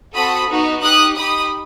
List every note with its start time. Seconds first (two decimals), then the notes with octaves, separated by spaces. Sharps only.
0.15 C4 F#4 A4 B5 D#6
0.49 B3 D#4 F#4
0.82 D#4 G4 D#6 F#6
1.16 D#4 G4 B5 D#6